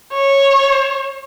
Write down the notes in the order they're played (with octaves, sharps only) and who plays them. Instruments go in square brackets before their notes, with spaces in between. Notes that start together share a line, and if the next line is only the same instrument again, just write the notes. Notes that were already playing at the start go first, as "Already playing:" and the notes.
[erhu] C#5